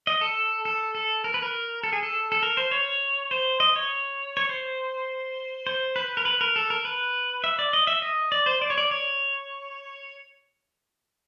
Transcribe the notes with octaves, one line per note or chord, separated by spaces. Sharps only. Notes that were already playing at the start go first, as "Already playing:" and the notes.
D#5
A4
A4
A4
A#4
B4
A#4
A4
G#4
A4
A4
A#4
C5
C#5
C5
D#5
C#5
C#5
C5
C5
B4
A#4
B4
A#4
A4
A#4
B4
E5
D5
D#5
E5
D#5
D5
C5
D5
C#5
D5
C#5